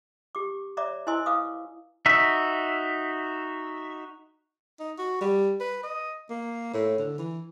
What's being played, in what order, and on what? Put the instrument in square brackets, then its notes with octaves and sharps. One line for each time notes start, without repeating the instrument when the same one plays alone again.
[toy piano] G4 D6
C#5 D5 E5 A#5 D6
E4 C5 D#5 G#5 C6 E6
B4 F5 D6 D#6
[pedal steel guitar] D#4 F#4 E5
[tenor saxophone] D#4
F#4
G3
B4
D#5
A#3
A2
D3
E3